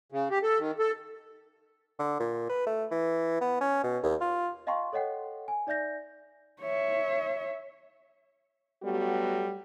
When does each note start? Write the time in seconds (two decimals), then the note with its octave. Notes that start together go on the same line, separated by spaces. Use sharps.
0.12 C#3
0.31 G4
0.43 A4
0.59 D#3
0.79 A4
1.99 D3
2.20 A#2
2.50 B4
2.67 A3
2.91 E3
3.41 B3
3.61 C#4
3.84 B2
4.04 D#2
4.21 F4
4.67 D#5 F5 G5 A5 C6 C#6
4.93 A4 C#5 D#5 F#5 G5
5.48 G#5
5.67 D#4 D5 E5 G6 A#6
6.62 C#5 E5
8.83 F#3 G3 A3 B3 F#4 G4